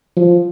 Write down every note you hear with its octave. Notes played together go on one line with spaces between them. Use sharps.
F3